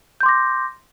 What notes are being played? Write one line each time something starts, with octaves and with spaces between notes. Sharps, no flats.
C6 D6 G6 A#6